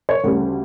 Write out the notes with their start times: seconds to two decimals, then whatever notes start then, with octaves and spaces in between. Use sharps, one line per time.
0.09 C#5
0.24 D2 C#3 G3